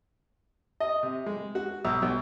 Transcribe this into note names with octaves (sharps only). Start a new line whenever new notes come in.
D#5
C3
G#3
F#4
B1
B1